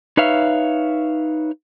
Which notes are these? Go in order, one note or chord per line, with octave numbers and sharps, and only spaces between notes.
D#4 B4 C#5 E5 F5